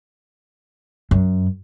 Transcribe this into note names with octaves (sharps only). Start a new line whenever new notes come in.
F#2